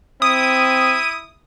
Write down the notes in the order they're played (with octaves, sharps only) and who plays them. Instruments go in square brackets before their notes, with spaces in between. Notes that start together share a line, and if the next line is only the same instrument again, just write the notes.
[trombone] C4 [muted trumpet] E4 [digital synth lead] D#6